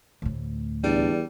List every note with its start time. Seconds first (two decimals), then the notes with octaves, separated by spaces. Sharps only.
0.22 D2 A2
0.84 E2 G3 D4